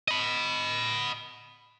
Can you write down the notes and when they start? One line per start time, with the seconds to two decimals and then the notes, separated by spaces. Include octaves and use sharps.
0.08 D#5 B5